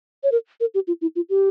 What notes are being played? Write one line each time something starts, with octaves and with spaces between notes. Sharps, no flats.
C#5
A#4
A#4
G4
F4
E4
F4
G4